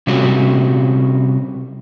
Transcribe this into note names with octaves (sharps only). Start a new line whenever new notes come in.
C3 G3 C#4 F#4